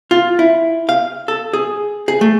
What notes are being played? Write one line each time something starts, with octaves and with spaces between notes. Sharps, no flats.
F4
E4
F5
A4
G#4
G#4
A3